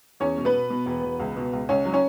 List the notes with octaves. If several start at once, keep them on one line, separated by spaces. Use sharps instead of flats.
E2 C#4 C#5
B2
B3 B4
B2
B2
E1
E1
C#2
B2
C#2
C#2 C#4 C#5
F#3
C#4 C#5